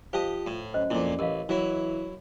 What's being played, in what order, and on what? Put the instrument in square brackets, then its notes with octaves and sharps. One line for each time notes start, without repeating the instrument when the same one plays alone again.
[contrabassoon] F3 [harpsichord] G4 D#5 [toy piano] C5 F5 A5
[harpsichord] A2
[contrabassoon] F#2 [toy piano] C#4 C5 D#5
[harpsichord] F2 A#2 [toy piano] E4 D6
[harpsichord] A1 [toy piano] A#4 D#5 F5
[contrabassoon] E3 [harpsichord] F#3 E4